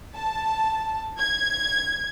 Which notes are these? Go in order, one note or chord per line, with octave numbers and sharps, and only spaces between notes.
A5
G#6